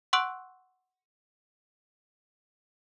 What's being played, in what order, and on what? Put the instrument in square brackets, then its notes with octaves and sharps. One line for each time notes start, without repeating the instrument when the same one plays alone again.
[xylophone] F#5 C6 C#6 E6 F#6 D7